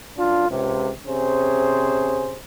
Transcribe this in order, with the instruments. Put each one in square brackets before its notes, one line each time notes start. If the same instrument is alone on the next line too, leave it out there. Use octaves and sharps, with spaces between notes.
[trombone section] F#2 D4 F4
C#2 C3
C3 C#4 G#4 C5